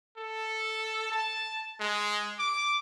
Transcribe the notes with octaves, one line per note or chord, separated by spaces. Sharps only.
A4
A5
G#3
D6